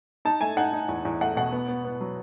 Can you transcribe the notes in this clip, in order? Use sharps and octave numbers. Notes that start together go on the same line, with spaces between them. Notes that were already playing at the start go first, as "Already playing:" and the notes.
D#4 A5
A3 G#5
D#4 F#5
D#4
E2
E2
A3 F#5
B2 F#5
B3
B3
B3
F#3